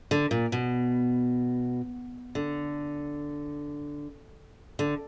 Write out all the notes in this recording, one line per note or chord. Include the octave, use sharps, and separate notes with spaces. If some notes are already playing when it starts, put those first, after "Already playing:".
D3
A#2
B2
D3
D3